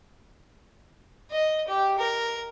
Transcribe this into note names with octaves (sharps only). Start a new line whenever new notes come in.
D#5
G4
A#4